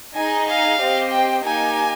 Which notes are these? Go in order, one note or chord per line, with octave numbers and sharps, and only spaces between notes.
D#4 G#4 D#5 G#5
F5
C4 G4 C5 D#5
G5
A#3 D#4 G4 G#5